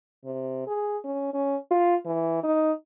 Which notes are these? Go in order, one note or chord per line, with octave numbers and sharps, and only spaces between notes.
C3
G#4
C#4
C#4
F4
E3
D#4